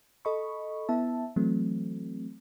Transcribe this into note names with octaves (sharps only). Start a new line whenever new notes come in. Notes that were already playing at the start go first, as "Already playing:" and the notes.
A4 D#5 B5 C#6
B3 E4 E5 A5
E3 F#3 A3 C4